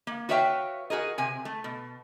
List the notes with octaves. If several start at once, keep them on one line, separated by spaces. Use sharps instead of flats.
A#3
F#4 B4 C#5 E5 F5 G5
F#4 G#4 A#4 D#5
C3 G#5
A3
B2